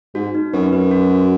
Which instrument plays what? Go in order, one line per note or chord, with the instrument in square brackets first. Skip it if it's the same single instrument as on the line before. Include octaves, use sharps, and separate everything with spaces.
[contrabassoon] G#2 [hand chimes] F#4
[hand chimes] D#4
[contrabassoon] F#2 [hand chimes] B4
[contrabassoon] F#2 [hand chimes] B4
[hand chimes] F#4
F#4